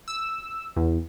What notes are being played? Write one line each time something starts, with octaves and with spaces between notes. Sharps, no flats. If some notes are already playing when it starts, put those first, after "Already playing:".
E6
E2